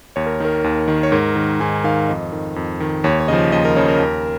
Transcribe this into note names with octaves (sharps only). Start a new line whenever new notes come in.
D#2 C#5
A#4
D#3 A#4
D#2
D#3
C#5
G#2 A#4
D#3
G#2 G#5
D#3 F5
F2 D#5
D#3
F2
D#3
D#2 C#5
C#5
C#3 F3 D#5
D#2 D#5
A#4
C#3 F3 C#5
A#4
D#2